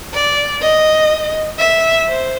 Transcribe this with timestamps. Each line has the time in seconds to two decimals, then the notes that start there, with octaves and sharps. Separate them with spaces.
0.13 D5
0.61 D#5
1.58 E5
2.08 C5